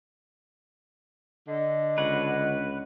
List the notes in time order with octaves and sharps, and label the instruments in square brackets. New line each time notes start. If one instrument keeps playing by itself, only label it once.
[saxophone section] D3 [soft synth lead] D#5
[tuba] C#2 [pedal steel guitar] B4 C#5 F#5